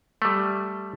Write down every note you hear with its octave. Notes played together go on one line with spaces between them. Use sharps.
G3 A3